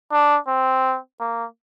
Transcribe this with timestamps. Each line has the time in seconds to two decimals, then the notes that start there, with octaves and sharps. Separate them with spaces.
0.12 D4
0.47 C4
1.20 A#3